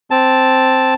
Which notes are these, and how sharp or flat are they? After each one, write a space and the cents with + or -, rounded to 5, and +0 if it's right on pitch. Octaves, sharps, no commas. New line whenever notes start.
C4 +0 A5 +0